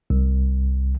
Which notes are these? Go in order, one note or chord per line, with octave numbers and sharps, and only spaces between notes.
C2